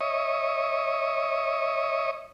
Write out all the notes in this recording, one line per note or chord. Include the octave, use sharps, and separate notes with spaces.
C#5 D#5 E5 C#6 D#6